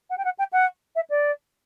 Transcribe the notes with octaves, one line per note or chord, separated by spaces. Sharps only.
F#5
G5
F#5
G5
F#5
E5
D5